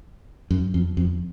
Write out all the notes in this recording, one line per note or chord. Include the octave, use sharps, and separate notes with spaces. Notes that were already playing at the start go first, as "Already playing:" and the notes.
F#2
F2
F2